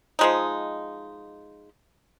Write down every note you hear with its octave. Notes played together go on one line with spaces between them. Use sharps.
F3 G#3 D#4